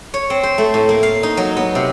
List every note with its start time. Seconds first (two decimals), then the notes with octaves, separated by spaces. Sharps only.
0.14 C#5
0.30 C4
0.43 C5
0.58 A3
0.74 A2
0.89 A#3
1.03 F5
1.23 D#4
1.37 F#3
1.57 B3
1.75 C3